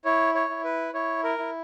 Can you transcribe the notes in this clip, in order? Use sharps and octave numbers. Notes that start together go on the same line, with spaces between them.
E4 C#5
C#5
E4
B4
E4 C#5
A#4
E4